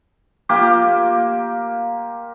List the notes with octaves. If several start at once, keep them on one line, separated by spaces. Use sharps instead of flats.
A#3 F4 G4